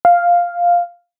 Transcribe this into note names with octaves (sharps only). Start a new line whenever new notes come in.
F5